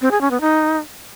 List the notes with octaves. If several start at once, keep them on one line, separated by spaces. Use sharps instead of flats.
C4
G#4
C#4
B3
D#4